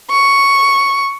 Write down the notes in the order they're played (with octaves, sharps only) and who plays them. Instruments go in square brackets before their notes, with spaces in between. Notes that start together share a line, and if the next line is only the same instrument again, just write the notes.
[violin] C#6